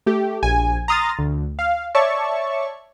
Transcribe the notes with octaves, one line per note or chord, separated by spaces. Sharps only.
A3 G4
A#1 G#5
A#5 C6 D#6 F6 A6
D2
F5
C#5 D5 E5 A5 C#6